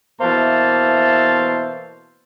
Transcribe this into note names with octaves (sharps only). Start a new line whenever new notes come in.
B2 E3 A#3 C5 E5 A5